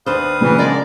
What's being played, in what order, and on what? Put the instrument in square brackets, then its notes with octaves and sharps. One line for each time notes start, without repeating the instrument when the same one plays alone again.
[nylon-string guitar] D#2 D4 C5 [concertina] B4 F5 D#6
[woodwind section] A#2 E3 [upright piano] C#3
[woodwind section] F3 G#3 D5 [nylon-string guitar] B3 D4 A#4